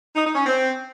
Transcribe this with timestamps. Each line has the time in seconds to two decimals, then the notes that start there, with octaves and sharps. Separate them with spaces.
0.15 D#4
0.25 D#4
0.35 C#4
0.46 C4